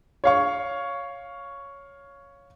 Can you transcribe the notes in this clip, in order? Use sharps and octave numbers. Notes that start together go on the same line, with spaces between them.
C#5 F5 C#6